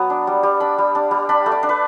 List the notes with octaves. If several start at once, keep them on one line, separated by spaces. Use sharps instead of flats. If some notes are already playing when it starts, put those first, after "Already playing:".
Already playing: F#3 B3 A5
D4
G3
G3
D4 B5
G3
D4
G3
D4 B5
A3
D5
D4
B4